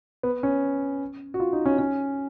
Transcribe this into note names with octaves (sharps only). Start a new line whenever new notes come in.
B3
C#4
F#4
F4
D#4
C#4
C#4